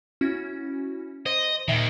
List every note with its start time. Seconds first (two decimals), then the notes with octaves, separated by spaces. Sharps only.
0.21 C#4 E4 F#4
1.26 C5 D#5
1.68 D#2 A#2 D#3 E5